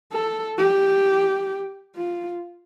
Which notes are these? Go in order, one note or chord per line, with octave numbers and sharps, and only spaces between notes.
A4
G4
F4